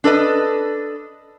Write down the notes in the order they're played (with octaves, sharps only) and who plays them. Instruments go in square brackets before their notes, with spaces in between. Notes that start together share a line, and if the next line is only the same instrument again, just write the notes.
[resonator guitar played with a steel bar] D4 A4 B4 D#5